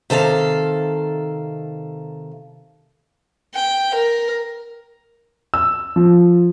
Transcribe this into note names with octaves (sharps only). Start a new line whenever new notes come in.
C3 D#3 A4 F5
G5
A#4
E6
F3